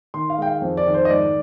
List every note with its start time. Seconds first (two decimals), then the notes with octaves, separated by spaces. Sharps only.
0.14 D#3 C6
0.30 F5
0.38 G#3 G5
0.46 F5
0.62 F2
0.77 D5
0.86 D#3
0.94 C5
1.05 D#5
1.09 G#2 D5